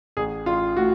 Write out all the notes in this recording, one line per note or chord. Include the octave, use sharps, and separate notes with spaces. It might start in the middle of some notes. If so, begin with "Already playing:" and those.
A1 G#4
A1 F4
A2 F#4